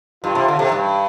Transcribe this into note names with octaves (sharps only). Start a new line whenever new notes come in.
G2 F4
C3
D3
C3
G2